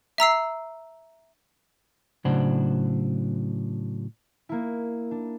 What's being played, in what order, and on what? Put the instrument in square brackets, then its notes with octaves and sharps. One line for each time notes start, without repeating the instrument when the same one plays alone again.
[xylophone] E5 A#5 E6 C7
[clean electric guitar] A2 C#3 F#3 D4 C5 F#5
[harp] A#3 E4
D4